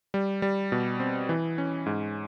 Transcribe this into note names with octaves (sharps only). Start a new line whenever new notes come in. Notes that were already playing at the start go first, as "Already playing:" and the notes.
G3
G3
B2
C4
E3
C#4
G#2